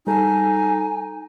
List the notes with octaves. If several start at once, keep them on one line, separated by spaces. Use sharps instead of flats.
G3 D#4 A4 G#5